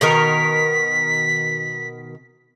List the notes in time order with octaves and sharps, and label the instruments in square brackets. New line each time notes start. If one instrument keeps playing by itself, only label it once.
[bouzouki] B2 D#3 A#4 [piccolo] B6